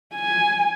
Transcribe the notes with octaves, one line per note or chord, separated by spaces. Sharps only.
G#5